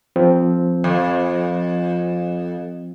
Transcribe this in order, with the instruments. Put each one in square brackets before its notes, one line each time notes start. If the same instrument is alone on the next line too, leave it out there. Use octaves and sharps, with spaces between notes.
[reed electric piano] F3 C4
[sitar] F2